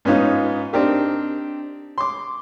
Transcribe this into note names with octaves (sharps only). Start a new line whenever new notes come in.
G#2 B3 C#4 D#4 F4
C4 D4 D#4 G4 A#4
C6 D6